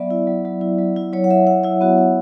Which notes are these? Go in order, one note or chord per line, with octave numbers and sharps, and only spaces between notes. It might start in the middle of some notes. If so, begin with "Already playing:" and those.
Already playing: F#3 B3 D5 E5
E4
F#3
F#3
E4
F#3
E4
F#3 C#5
F#5
F#3 E5
E4 F#5
E4 E5
B3 F#4
E4